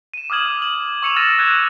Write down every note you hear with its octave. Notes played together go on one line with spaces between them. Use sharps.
D#7 E7
D6 D#6 F6 G#6 F#7
F#7
C#6 E6 C#7 E7 F7
E6 F6 A6 A#6 D#7 E7
E6 F#6 G#6 E7